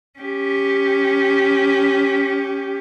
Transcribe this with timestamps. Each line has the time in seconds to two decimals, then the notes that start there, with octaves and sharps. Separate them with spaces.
0.19 C#4 G4